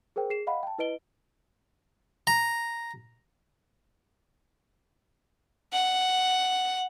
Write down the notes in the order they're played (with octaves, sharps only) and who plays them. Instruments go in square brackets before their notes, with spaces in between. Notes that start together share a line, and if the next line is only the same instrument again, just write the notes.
[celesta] G#4 A#4 C5 G5
G#4 C7 E7
D#5 F5 F#5 B5
G5 A5
E4 B4 D#5 D7 G7
[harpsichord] A#5
[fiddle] F#5